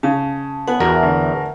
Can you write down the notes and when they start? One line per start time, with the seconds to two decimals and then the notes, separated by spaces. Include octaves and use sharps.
0.03 C#3 A5
0.68 B3 F#5 G#5 A5
0.80 E2 F#4 A#4
1.02 D2